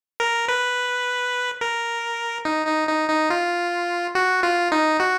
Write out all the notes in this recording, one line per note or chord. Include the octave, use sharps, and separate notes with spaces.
A#4
B4
A#4
D#4
D#4
D#4
D#4
F4
F#4
F4
D#4
F#4